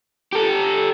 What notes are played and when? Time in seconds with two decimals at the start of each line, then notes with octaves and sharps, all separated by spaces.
0.32 G4 A4